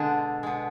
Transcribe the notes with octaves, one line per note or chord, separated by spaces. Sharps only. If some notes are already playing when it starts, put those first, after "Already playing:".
Already playing: B2 D3 G#3 D4
B2 G#3